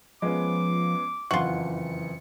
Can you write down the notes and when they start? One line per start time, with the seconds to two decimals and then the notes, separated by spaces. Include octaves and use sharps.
0.22 F3 G#3 B3 C#4 D6
1.31 F#1 F2 E3 F4 F#4 C#7